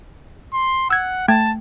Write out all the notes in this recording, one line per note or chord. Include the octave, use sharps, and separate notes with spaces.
C6
F#5 E6 G#6
A3 G5 A5 G#6